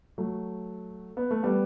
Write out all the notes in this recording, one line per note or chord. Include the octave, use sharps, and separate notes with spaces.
F#3 A3
B3
A3
G3 B3